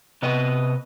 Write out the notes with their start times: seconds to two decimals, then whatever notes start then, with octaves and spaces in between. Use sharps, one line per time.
0.22 C3 B3 B4 D#5